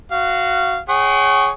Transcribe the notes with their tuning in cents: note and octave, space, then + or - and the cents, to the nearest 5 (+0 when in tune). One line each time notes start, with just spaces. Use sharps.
F#4 +0 F5 -20
G#4 +0 C#5 +0 F#5 +45